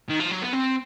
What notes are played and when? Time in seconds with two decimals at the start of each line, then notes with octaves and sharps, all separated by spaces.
0.09 D#3
0.20 F3
0.31 F#3
0.42 B3
0.53 C4